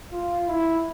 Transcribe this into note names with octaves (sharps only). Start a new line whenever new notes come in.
F4
E4